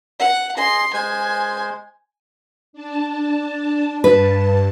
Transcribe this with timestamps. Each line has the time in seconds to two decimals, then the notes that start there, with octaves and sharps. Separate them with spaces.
0.19 F#5
0.57 G#4 D#5 C6
0.93 G#3 C5 G#5
2.73 D4 A5
4.04 G2 B4 A5